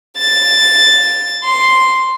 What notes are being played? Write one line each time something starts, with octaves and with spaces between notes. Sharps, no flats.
A6
C6